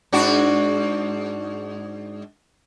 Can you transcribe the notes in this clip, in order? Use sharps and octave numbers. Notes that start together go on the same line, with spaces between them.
G#2 D4 F#4